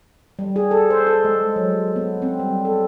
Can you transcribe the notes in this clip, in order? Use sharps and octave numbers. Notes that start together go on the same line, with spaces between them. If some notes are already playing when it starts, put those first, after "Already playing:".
G3
G#4
A4
C5
A4
G#3
F#3
B3
C4
G3
A4